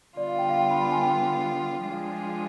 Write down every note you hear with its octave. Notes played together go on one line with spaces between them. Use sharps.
D3 G3 B3 F4 D5
F5
G5
F5
G5
B5
B5
G#5
G5
F3 G#3 D4 F4 G#4